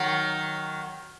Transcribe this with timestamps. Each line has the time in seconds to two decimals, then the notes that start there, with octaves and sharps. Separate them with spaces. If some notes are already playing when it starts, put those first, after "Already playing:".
Already playing: D#3 F#3